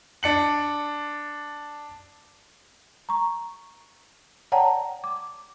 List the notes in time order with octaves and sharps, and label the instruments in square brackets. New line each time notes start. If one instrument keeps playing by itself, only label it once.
[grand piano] D4 C#7 F#7
[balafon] A#5 C#6
C#5 D5 F#5 G5 A5 A#5
D6